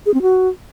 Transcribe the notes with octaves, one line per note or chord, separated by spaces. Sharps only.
G#4
C4
F#4